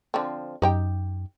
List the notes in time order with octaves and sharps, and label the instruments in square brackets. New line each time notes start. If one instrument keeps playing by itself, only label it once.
[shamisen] D3 F3 C4
[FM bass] F#2 [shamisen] D#4 G4 G5